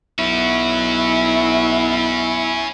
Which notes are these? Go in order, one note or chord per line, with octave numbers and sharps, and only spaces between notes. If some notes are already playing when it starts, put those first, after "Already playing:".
B1 C#4 E4 F#4